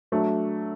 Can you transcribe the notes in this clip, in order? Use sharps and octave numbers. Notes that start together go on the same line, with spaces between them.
F#3 A3 D4